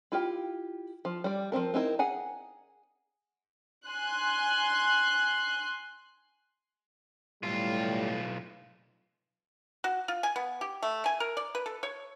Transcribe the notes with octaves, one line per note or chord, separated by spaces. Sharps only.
E4 F4 G4 G5
F3
G3 D5
F3 A3 C4 A#4
C4 D#4 E4 A#4
G#4 F#5 G#5 A#5
G#5 C6 F#6
B1 A2 G3 F4
F#4
F4
G#5
B3
G4
A3
G#5
A#4
D5
B4
A4
C#5